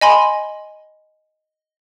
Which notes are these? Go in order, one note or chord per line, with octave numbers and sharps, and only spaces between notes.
D#5 G#5 B5 C6